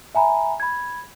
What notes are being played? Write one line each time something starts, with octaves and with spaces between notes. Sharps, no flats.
E5 G#5 A#5 B5
B5 G#6